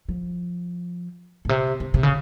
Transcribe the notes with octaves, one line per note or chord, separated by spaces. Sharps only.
F3
A#2
C3
C3
C3
C#3